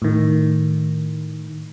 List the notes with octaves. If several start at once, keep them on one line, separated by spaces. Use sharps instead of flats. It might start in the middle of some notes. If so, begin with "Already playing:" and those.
A2 D#3